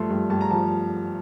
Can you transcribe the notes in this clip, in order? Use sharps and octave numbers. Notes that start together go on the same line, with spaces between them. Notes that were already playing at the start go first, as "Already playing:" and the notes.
Already playing: G2 F3 A3 C6
G2
G2 A5
A#5
F3 A5